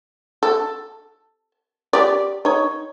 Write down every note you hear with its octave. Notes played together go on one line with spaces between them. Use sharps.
A4
G4 D5
D#4 C#5